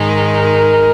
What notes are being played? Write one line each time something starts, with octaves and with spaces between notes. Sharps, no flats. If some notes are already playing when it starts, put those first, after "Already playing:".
Already playing: G#2 D#3 G#3 D#4
A#4